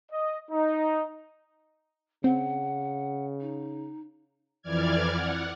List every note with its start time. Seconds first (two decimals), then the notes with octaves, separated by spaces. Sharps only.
0.12 D#5
0.51 D#4
2.24 C#3 C4 F#5
3.41 D#4
4.62 F2 E3 D5 F6 G#6
5.13 F#5